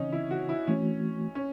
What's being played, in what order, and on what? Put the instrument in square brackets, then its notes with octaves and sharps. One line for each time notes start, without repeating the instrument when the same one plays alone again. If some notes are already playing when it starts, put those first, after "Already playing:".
Already playing: [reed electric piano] C#3 E3 C4 [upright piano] C#4 D#4
[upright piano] E4
F#4
E4
[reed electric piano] E3 A3 C4 F#4 [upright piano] C#4
[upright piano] C#4